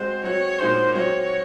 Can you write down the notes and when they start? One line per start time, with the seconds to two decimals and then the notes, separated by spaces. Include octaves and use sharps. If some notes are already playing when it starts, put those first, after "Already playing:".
Already playing: G#3 C4 F#4 C5
0.24 F#3 C4 F#4 C#5
0.59 A#2 G#3 D#4 F#4 C5
0.95 F#3 C4 F#4 C#5